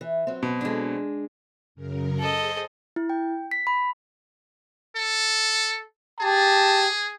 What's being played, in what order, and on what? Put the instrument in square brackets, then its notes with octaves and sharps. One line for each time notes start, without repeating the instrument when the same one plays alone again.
[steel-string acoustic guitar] E3
F#3 C4
[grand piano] B2
[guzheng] G#3 D4
[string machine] F#2 C#3 A#4
[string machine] G#4 C5 [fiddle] A4 D#5
[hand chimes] E4
G5
B6
B5
[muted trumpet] A4
[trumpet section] G4 A5 [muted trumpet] G#4